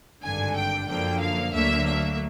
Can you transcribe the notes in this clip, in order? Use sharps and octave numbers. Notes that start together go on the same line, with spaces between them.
G#1 G2 D3 G#5
G5
F#2 D3 F3 A#3 G5
F5
D2 D3 F#3 A#3 E5
E5